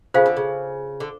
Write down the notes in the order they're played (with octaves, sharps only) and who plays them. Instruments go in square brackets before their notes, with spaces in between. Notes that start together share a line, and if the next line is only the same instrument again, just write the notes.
[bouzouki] C#3 [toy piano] F4 A4 C5 F5 G#5
[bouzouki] D3
C#3
D3